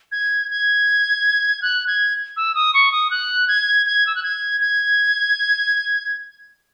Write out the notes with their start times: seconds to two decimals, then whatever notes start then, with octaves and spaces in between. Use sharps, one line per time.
0.12 G#6
0.50 G#6
1.62 F#6
1.87 G#6
2.37 E6
2.55 D#6
2.74 C#6
2.92 D#6
3.11 F#6
3.48 G#6
3.86 G#6
4.07 E6
4.15 F#6
4.23 G#6
4.61 G#6